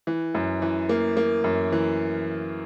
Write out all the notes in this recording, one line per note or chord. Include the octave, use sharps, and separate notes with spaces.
E3
F#2
E3
A#3
A#3
F#2
E3